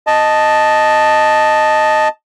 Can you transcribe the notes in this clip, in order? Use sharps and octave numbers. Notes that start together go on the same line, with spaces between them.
D#5 A5